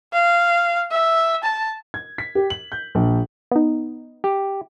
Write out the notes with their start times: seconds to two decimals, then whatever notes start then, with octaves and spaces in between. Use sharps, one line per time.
0.13 F5
0.91 E5
1.43 A5
1.94 G#6
2.18 B6
2.35 G4
2.50 F#7
2.72 G6
2.95 A#1
3.52 B3 D#4
4.24 G4